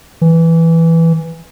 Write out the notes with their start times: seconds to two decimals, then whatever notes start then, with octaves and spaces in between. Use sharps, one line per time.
0.21 E3